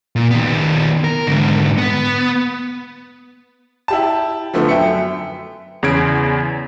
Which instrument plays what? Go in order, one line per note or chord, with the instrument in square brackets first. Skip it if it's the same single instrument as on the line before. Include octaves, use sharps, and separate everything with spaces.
[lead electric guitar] A#2
D#3 B3
A#4
G#2 D3
B3
[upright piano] E4 G4 A5
D3 F3 A3 B3
F#2 E5 G5 C#7
[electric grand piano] E2 C#3 G#6 D7